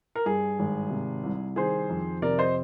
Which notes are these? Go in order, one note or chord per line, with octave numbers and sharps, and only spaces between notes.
A#4
G2 G#4
G#1
C3
C2
D#3 G#4 C5
F2
C3 A#4 D5
C5 D#5